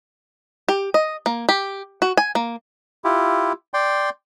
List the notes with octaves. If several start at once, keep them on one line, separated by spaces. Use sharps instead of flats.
G4
D#5
A#3
G4
F#4
G#5
A#3
E4 F4 G4
D5 G5 C6